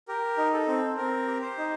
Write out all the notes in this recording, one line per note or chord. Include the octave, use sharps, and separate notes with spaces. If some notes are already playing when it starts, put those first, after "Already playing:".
G4 A#4
D#4
A4
C4
C4 A#4
G4
C5
D#4